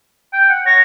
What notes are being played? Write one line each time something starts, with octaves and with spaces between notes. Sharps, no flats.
G5
F#5
C#5 A#6